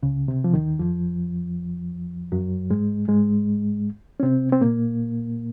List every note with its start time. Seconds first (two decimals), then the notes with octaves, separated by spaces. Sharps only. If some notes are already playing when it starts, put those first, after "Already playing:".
0.03 C#2 C#3
0.28 C3
0.44 F3
0.54 D#2 D#3
0.79 F2 F3
2.32 F#2 F#3
2.70 G#2 G#3
3.08 G#2 G#3
4.20 C#4
4.23 C3 C4
4.52 C4
4.61 A#2 A#3